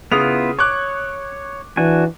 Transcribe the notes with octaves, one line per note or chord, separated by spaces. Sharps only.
C#3 B3 E4 F4 D#6 F7
C#5 C#6 D6 F#6
E3 D4 F#4 G#5